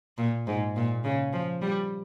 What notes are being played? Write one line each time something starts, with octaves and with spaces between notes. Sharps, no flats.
A#2
G#2
A#2
C#3
F3
G3